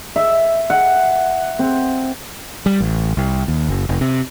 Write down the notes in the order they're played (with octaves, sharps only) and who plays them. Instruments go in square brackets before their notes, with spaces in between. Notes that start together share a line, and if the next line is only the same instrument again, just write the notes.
[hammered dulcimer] E5
F#5
C4
[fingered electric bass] G3
A1
C2
D#2
F#1
F1
C3